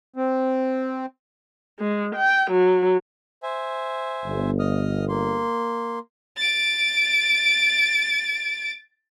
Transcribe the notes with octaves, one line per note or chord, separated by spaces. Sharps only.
C4
G#3
G5
F#3
C5 E5 G#5
G1
D#5 D#6 F6
A#3 C6
A6 D7